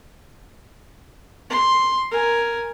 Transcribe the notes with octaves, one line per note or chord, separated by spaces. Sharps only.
C6
A#4 G#5